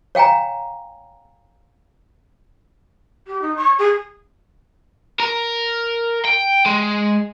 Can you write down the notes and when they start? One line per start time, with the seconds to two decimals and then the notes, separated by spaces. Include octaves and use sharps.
0.15 C#5 F5 G5 G#5 A#5
3.27 G4
3.41 D#4
3.56 C#6
3.78 G#4
5.20 A#4
6.25 G5
6.66 G#3